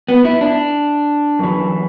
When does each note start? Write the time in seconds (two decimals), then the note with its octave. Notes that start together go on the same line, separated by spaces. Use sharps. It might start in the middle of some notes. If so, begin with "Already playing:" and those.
0.08 B3
0.25 E4
0.41 D4
1.39 F#2 E3